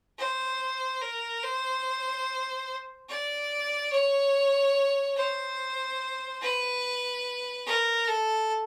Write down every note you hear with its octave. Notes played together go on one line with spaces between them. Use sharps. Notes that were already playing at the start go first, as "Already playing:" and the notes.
C5
A#4
C5
D5
C#5
C5
B4
A#4
A4